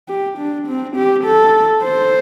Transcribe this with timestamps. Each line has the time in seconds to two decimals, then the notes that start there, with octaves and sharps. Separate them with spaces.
0.09 G4
0.38 D4
0.67 C4
0.96 G4
1.24 A4
1.83 C5